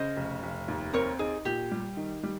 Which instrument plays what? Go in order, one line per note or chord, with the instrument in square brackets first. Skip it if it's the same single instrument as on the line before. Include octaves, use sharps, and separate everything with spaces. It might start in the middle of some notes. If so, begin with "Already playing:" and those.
Already playing: [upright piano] C#3 [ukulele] C5 D#5
[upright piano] F1
F1
D#2
[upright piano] C4 [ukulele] A#4 C#5
[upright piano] D#4 [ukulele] G#4
[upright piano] A#2 [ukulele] G4
[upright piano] G3
D#3
G3